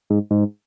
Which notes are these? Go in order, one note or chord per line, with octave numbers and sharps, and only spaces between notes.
G#2
G#2